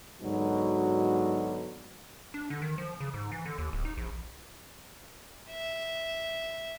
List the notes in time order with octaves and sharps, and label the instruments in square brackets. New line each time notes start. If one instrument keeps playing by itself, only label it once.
[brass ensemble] G#2 B2 D3 F#3
[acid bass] D4
D3
D#3
F3
C#3
G#2
E3
D3
D#2
D1
D#4
A#1
[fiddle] E5